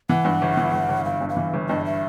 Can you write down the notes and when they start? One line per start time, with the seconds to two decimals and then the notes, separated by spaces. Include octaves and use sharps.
0.09 E3 F#5
0.25 G2
0.42 G1
0.57 E3
0.73 G1
0.89 G1
1.05 G1 F5
1.21 G2
1.29 F5
1.37 E3
1.54 G1
1.69 G2 D#5
1.85 E5